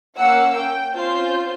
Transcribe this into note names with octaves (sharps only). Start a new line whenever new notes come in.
A#3 C#4 F5 F#5 E6
G5
C4 C#4 F4 C5 G6